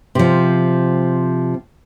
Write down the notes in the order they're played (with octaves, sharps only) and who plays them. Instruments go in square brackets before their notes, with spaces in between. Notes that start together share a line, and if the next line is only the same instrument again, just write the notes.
[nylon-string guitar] C3 F3